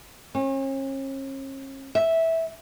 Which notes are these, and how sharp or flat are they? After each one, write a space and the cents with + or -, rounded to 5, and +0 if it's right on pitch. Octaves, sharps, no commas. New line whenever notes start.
C#4 -40
E5 -10